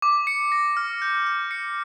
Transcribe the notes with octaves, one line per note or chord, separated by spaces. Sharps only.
D6
C#7
A#6
F6
G6
G6
C#7